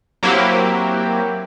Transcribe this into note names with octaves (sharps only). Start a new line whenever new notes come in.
F#3 A#3 C4 E4 G4